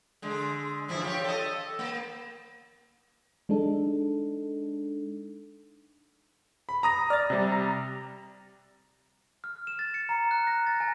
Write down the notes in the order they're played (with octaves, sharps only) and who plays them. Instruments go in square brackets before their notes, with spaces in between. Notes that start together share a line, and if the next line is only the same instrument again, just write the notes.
[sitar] D3 G#3
G2 F3 E4
F4 G4 C#5
A4 D#5
A#3
[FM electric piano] G#3 D4 D#4 A4
[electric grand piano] B5
A#5 D#6 A#6
[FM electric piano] D5 [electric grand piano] F6 A6
[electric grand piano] C3 G3
[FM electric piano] A#5
[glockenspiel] F6
E7
A6
C#7
A#5
F#6
A#6
A6
G#5